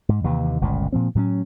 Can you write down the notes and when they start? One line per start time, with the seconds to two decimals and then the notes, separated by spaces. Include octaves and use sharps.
0.09 G#2
0.24 D#2 C3 E3
0.61 G1 C#2 A#2
0.93 A#2 F3 C4
1.15 A2 F#3 A#3 C#4